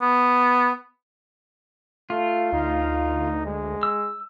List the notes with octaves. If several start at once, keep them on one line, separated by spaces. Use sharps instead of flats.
B3
A3 F4
D2 D#4
G#3
E6